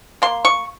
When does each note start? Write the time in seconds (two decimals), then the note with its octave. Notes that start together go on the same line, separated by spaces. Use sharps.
0.22 A#3 C6
0.45 C#6